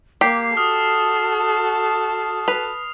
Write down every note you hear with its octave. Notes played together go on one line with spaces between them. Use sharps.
A#3 G4 C7
F#4 A4 D#6 F6
B4 F7